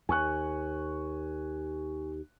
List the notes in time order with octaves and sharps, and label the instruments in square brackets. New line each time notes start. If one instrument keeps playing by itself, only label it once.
[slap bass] D#2 [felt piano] G#5 C#6 F#6